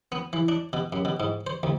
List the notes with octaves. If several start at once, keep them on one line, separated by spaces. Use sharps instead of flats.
B3
E3
D4
B2
F#2
B2
G#2
C5
D2